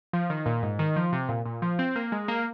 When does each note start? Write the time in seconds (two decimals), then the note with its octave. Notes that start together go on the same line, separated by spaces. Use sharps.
0.13 F3
0.30 D#3
0.46 A#2
0.63 G#2
0.79 D#3
0.96 F3
1.12 C3
1.29 A#2
1.45 A#2
1.62 F3
1.79 C4
1.96 A#3
2.12 G#3
2.28 A#3